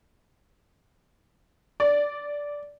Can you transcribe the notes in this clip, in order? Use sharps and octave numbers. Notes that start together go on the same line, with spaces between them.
D5